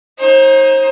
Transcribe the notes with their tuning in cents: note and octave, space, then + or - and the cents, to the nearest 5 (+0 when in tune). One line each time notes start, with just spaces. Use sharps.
D#4 +15 C5 +40